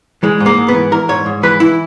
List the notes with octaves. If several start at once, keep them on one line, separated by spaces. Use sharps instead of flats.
E3 G#3
G#2
A#3
G#2
B3
E3
E3 A#4
G#2 C#5
G#2
E3 B4
E3 E4